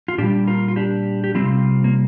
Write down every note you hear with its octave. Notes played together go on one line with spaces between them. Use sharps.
F4
A#2 G3 D4 G4
F4 A#4
F4
D4 G4
G4
C3 G3 C4 F4
A#3